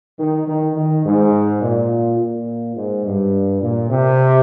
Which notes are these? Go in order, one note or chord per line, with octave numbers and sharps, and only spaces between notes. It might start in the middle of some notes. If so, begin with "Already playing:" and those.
D#3
D#3
D#3
G#2
A#2
A#2
G#2
G2
A#2
C3